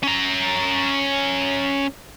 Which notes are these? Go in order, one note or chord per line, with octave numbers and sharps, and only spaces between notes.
C#4 A#5